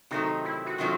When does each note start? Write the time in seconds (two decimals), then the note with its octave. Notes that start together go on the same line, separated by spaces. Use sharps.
0.11 C3 D#3 F#3 A3 D#4
0.45 E4
0.66 F#4
0.78 C3 D#3 F#3 A3 F4